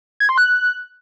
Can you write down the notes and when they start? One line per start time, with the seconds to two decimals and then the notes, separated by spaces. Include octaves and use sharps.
0.20 G#6
0.29 C6
0.38 F#6